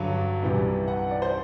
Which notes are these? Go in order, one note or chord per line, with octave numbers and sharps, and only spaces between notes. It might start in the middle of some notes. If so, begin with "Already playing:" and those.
Already playing: G2 D3 F#3
C2 C3 E3 G3
F#5
D5
C5